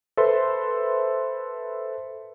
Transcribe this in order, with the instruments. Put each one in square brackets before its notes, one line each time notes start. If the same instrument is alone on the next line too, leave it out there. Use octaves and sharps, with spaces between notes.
[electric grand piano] A4 B4 C5 E5 C6